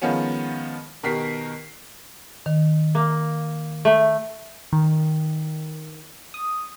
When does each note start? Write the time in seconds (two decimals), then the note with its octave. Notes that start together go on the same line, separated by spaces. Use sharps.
0.02 D#3 F3 G#3 B3 C#4
1.03 B2 D#3 G4 A#4 B6 C7
2.46 D#3
2.95 A#3
3.85 A3
4.73 D#3
6.34 D#6